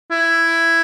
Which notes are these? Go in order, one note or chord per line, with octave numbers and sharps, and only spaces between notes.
E4